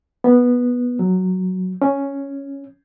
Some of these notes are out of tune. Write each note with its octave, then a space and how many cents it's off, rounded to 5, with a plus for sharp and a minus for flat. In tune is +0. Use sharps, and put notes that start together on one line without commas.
B3 -10
F#3 +0
C#4 +0